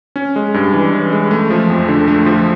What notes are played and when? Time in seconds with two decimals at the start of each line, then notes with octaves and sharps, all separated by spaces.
0.16 C#4
0.36 G#3
0.54 G2
0.73 E3
0.93 C#4
1.12 G#3
1.31 A3
1.50 F3
1.70 F2
1.88 D3
2.08 A3
2.26 F3